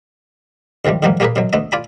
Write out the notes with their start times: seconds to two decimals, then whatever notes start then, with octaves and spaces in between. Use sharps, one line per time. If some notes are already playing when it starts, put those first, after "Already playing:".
0.85 D2 C3 D#3 F3 G3
1.02 E2 G#2 B2 F#3 G3 A#3
1.20 G3 A#3 G4 G#4 A#4 B4
1.36 F#2 B2 F#3
1.53 D2 A3 B3 D#5
1.72 F4 D5 G#5 B5